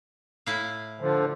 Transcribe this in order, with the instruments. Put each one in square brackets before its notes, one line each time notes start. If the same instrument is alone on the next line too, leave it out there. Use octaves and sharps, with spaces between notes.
[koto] A2 E4 F5
[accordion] D3 F3